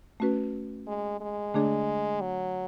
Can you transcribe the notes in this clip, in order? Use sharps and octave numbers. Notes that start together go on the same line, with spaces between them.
A3 C#4 F#4 B4
G#3
G#3
D3 A3 D4 G#4 D5
F#3